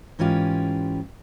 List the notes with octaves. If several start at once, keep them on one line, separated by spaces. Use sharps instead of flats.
G#2 E3 C#4 F4 G4